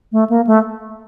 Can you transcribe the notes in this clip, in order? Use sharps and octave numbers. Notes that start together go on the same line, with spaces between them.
A3
A#3
A3